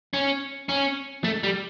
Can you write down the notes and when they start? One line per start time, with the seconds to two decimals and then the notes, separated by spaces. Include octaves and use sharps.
0.13 C#4
0.69 C#4
1.24 A3
1.43 G3